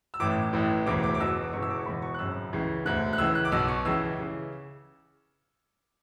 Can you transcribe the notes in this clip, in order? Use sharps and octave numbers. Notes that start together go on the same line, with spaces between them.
E6
A1 A2 E3 D6
A1 A2 E3
E1 D2 C#3 E3 D6
D6
D6
E1 E2 B2 E6
D6
E1 E2 C#3 E3 C#6
E6
D6
C#6
E1 E2 B2 B5
C#6
F#6
G#1 F#2 C#3 E6
C#2 C#3 E3
E1 D2 D3 F#6
F#6
C#2 C#3 E3 E6
F#6
D6
B1 B2 E6
C#6
C#2 C#3 E3 E6
C#3 E3